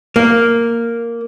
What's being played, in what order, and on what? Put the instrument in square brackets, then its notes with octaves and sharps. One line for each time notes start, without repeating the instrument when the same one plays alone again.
[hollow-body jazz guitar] A#3